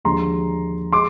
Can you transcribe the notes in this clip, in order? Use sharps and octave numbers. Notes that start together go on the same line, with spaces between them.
D#2 D3 F3 G#3 A#5 C6
G#3 C6 D6